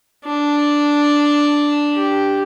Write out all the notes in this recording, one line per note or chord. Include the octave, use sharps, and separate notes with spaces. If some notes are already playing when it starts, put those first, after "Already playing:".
D4
G4